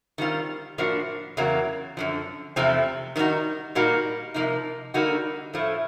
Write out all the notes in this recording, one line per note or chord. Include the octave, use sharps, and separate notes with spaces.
D#3 G3 C4 F4
A2 F3 A#3 D4 F#4
E2 C#3 F#3 A#3
F#2 D3 F3
E2 C3 F3 A3 C4
D#3 G3 B3 D#4 F#4
A#2 G3 A#3 D#4 F#4
C3 F3 A#3 D#4
D3 G3 A#3 D#4 F#4
A2 F3 A3